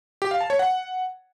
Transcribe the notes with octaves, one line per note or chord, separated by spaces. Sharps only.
G4
F5
A5
C#5
F#5